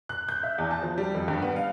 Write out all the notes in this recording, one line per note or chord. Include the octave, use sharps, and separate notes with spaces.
F#6
G6
E5
E2
A5
F3
G3
F2
G2
B3
F5